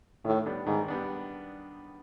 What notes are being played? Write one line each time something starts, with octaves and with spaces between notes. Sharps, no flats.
A2 D#3
G3 B3 D4
G#2 D#3
G3 B3 D4